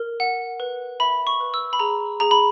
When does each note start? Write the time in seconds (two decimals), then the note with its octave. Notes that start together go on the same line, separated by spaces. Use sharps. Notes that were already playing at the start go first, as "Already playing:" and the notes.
Already playing: A#4
0.20 F#5
0.60 B4
1.00 E5 B5
1.27 C#6
1.40 B4
1.54 E6
1.73 B5
1.79 G#4 A#5
2.20 G#4 A#5
2.31 B5